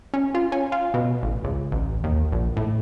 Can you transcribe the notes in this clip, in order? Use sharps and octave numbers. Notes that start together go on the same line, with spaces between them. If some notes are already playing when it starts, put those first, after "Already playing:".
C#4
F4
C#4
F4
B2
A1
C#2
A1
D#2
A#1
A2